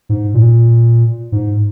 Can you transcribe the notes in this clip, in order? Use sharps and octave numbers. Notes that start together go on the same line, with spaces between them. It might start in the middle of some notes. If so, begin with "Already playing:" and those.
G#2
A#2
G#2